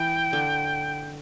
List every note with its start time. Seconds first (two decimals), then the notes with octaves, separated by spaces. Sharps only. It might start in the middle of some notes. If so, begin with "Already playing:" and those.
Already playing: E3 G5
0.33 D3